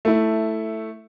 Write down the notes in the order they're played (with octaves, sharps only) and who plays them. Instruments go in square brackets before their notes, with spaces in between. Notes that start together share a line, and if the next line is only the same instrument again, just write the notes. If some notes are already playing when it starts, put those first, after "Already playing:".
[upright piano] A3 E4